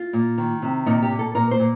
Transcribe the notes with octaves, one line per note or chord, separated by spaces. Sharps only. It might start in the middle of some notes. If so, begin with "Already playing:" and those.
Already playing: F4
A#2
D#3
C3
A#2 D#4
G4
A#2
A4
A#2 A#4
C5
A#2